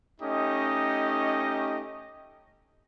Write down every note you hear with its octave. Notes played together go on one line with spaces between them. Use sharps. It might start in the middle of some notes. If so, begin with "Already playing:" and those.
A3 C#4 D#4 G4 D#5